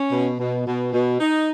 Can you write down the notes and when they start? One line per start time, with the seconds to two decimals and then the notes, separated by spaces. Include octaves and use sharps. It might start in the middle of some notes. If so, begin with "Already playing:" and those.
Already playing: C#4
0.11 B2
0.39 B2
0.66 B2
0.93 B2
1.19 D#4